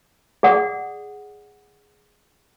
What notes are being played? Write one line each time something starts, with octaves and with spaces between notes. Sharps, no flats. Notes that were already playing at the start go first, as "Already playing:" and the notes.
G#4 D5 F#5 D#6